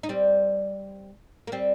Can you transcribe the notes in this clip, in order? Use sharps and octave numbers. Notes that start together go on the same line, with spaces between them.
D#4
G3 C4
A#3
G3 C4